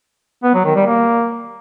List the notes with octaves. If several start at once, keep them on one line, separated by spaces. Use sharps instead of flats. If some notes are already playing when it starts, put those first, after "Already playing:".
B3
F#3
D#3
G3
A#3